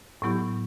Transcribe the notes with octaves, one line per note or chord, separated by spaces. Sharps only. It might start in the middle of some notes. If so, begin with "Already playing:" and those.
A2 F#3 B3 E4 G4